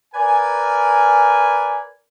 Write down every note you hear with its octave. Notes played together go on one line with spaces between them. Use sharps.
A#4 B4 D5 G#5